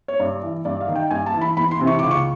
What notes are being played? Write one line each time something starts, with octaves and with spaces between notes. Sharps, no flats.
C#5
G2 D5
E3
G2 D5
F5
D#3
G5
G2 G#5
A5
E3
B5
E2 B5
C6
C3 E3
C#6
C#2 D6
C#6